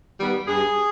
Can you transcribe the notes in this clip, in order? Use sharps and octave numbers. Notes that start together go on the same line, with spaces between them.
D#3 G3 B3
G2 G#4